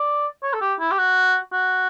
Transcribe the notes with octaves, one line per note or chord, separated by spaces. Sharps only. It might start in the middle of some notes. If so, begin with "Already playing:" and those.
Already playing: D5
C#5
A4
G4
E4
G4
F#4
F#4